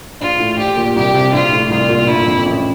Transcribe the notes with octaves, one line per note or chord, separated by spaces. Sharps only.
A#1 F4
A2
A#1 G4
A#2
C2 G4
C3
A#1 F4
A2
C2 F4
A#2
G1 E4
F2
A1